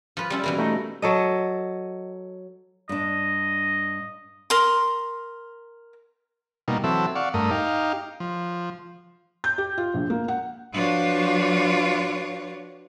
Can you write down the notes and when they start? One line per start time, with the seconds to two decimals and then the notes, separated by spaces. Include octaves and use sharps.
0.17 F3 F4 B4
0.30 G3 C#4 E4
0.43 B2 E3 A#3
0.58 A3 D#4
1.02 F#3 A4 D#5
2.89 G2 D4 D#5
4.50 A#4 C6
6.68 B2 G3 A#3 D#4
6.84 E3 F#3 C4 A4 E5
7.15 D5 F5 F#5 C#6
7.34 G2 A3 A#4 D#6
7.51 D#4 G4 F5
8.20 F3
9.44 G6
9.58 G4
9.78 F4
9.94 A#1
10.10 A#3
10.28 F#5
10.73 F3 D4 F4 F#4 B4 C#5